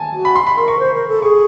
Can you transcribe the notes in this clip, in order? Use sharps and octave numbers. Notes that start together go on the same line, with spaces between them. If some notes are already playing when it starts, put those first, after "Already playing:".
Already playing: G#5 A5
F#4
B5
C6
B5
A#4 C6
C#6
C5
A#4
A4
G#4 C#6